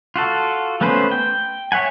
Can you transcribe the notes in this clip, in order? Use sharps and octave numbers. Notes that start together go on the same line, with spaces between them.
F4 F#4 A4
A3 B3 C#4 B4 C5
G5
C#5 E5 F#5 G#5